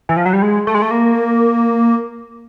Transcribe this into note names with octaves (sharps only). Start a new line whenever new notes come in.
E3
F3
F#3
G3
G#3
A3
G#3
A3
A#3